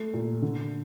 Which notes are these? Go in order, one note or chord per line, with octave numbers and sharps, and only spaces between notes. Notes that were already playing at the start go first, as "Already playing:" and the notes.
Already playing: A3
A#2
D3